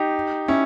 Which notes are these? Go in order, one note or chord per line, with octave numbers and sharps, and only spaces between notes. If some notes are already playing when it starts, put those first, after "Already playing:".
Already playing: D#4 G4
C#4 E4